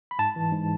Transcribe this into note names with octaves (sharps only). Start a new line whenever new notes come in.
B5
G#2 A5
E3
G#2